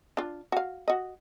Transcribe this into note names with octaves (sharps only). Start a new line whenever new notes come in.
D4 F4
F#4 F5
F#4 D#5